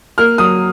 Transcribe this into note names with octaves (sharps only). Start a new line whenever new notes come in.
A#3 F6
F#3 D#6